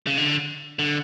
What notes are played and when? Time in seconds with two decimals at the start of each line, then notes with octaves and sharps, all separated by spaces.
0.07 C#3
0.17 D3
0.79 D3